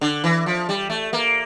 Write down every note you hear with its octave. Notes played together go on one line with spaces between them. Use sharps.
D3
E3
F3
G3
A3
A#3